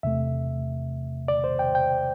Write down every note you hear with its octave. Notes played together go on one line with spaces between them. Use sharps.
E2 C3 A3 E5
D5
C5
G5
G5